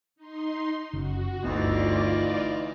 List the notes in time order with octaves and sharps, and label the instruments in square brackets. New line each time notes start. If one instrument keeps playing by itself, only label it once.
[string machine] D#4 C6
[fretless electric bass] F#1 C#3 [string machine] F#4
[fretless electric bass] G1 B3 [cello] D2 [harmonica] E3 D#4 [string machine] F4 D5